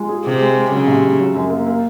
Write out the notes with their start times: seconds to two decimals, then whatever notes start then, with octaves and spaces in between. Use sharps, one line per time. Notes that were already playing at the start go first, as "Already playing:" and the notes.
Already playing: G#3 F4
0.09 G#4
0.25 C3 G#4
0.41 G#3
0.57 G#3
0.71 C#3 F#3
0.87 C3
1.03 C3
1.19 F#3
1.35 F#2
1.50 A#3
1.67 A#3